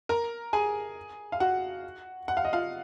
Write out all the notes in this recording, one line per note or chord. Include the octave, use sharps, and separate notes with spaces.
A#4 A#5
G#4 G#5
F5
F#4 F#5
F#5
F5
D#5
F4 F5